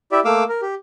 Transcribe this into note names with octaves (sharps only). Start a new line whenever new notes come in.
E4 G4 D5 E5
A3 A#3 F5 D6 E6
A#4
G4